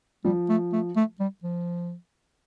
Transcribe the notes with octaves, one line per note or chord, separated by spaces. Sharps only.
F3 G3
A3
A3
A3
G3
F3